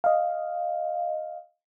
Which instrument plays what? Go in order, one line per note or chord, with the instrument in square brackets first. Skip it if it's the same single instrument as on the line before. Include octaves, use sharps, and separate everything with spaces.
[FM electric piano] D#5 F5